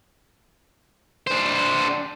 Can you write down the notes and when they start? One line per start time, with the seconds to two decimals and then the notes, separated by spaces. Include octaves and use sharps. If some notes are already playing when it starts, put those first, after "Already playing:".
1.27 D4 C5